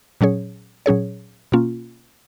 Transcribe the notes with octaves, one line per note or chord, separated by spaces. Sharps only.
A#2 F#3 C#4 G#4 C#5
A#2 F#3 C#4 G#4 C#5
B2 A#3 C#4 F4